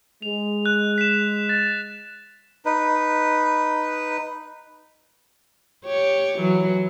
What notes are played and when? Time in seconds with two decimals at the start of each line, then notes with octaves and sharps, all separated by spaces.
0.22 G#3 F7
0.66 F#6
0.98 B6 E7
1.49 F#6 A6
2.65 D#4 B4
5.84 G4 C#5
6.39 E3 F#3